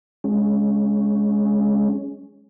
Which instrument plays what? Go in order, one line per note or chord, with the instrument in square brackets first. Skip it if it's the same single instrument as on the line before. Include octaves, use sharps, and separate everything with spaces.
[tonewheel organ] G#3 C#4